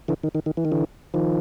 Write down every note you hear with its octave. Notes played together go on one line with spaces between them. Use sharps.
D3 E3
D#3
D#3
D#3
E3
D#3
D3 E3
D#3 F3